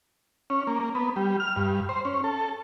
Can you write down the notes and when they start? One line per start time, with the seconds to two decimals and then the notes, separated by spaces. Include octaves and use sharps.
0.50 C#4
0.67 A#3
0.80 A#3
0.95 B3
1.16 G3
1.40 F6
1.56 G2
1.89 C5
2.05 C#4
2.24 A4